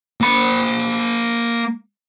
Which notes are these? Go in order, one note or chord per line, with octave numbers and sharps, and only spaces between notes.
A#3 B5